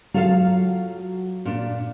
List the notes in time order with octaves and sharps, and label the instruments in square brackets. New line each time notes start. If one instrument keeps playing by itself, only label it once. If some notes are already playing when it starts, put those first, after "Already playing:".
[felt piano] F#3 [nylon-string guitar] F4 A4 F5
[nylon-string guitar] A#2 D4